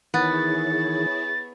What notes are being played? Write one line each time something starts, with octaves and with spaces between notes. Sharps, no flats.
D#3 E3 B3 E4 G#4 C#5 A6